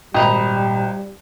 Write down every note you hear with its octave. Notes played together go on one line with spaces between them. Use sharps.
G#1 A#2 G3 D#5 G5 A#5 B5